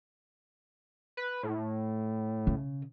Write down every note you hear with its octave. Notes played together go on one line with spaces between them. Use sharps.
B4
A2
C#3